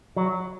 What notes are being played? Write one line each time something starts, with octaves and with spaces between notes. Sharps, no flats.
F#3